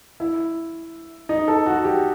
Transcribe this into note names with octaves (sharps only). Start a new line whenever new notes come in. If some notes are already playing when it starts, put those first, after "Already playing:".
E4
D#4
A4
F#4
G4